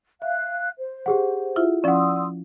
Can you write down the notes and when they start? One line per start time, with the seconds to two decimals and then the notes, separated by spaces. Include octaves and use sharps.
0.22 E5 F5 F#6
0.78 C5
1.06 G4 G#4 F#5
1.56 E4 F4 E5
1.84 F3 C#4 D5 F#5 C6 D#6 E6